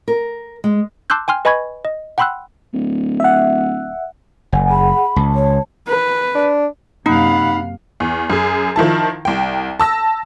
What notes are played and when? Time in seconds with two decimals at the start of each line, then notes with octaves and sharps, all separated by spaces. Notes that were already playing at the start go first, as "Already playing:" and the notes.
0.08 A#4
0.64 G#3
1.10 A5 C6 D6 E6 F#6 G6
1.28 G5 G#5 C6 F6
1.45 B4 D#5 G#5 B5 C#6 G#6
1.85 D#5
2.18 F#5 G5 B5 C6 E6 F#6
2.73 D1
3.20 E5 F#5
4.52 F#1 F#5 G#5
4.70 G#4 F#5 B5
5.16 C#2 A5
5.35 C#5
5.88 B4
6.35 D4
7.06 F#2 C3 A#3 D#4 F5 F#5 B5
8.00 E2
8.30 F#2 G#4
8.76 D#3 F3 E4 A5
9.25 C2 G5
9.80 A5 E6 A#6